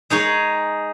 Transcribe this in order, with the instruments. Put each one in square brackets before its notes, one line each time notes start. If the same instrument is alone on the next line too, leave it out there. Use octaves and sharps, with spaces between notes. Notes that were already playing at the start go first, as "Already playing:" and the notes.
[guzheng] G#3 D#4 G#4 C#5